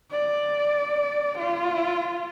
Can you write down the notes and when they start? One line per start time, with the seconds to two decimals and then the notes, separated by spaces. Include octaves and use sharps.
0.12 D5
1.39 F4